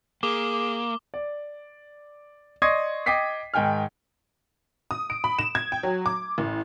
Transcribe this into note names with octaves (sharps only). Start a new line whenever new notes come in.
A#3 G#4 D6 G7
D5
D5 D#5 C6 C#6 G#6 C7
D#5 G5 D6 B6 C7
G#2 D#3 G5 G#5 F6
D#6
D7
B5
E7
G#6
G5
F#3
D6
A1